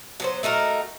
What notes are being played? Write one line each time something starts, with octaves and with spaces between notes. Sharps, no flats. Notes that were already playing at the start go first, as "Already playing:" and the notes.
F#3 B3 C5
A3 D#4 F#4 A#4